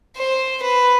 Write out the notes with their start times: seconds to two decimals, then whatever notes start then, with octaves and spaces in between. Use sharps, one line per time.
0.16 C5
0.62 B4